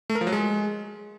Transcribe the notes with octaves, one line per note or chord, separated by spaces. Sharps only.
A3
A#4
F3
F#3
G#3